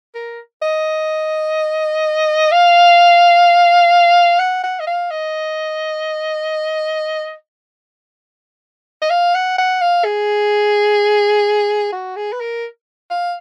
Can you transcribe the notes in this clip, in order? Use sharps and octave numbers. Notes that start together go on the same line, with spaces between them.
A#4
D#5
F5
F#5
F#5
D#5
F5
D#5
D#5
F5
F#5
F#5
F5
G#4
F#4
G#4
B4
A#4
F5